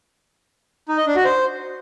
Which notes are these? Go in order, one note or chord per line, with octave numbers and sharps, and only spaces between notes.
D#4
D#5
D4
F#4
C5